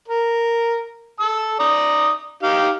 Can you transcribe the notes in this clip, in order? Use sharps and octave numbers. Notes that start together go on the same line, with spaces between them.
A#4
A5 E6
D5 A#5 D#6
D#4 G4 F5